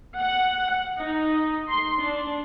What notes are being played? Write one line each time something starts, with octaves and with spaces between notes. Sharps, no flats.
F#5
D#4
C6
D4